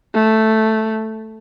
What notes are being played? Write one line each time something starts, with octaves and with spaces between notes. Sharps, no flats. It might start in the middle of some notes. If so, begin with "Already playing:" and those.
A3